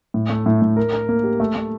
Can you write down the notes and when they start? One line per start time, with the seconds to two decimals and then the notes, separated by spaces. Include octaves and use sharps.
0.14 A2
0.30 A3
0.46 A2
0.62 A2
0.76 A#4
0.93 A#4
1.09 A#3
1.24 G4
1.40 A3
1.56 A3